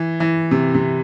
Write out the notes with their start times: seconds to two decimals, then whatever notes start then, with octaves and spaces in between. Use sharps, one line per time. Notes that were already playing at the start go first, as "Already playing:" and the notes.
Already playing: E3
0.20 E3
0.51 C3
0.74 C3